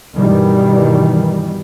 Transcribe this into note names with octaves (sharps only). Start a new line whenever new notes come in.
G2 B2 D#3 E3 G3